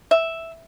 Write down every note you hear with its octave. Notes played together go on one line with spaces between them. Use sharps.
E5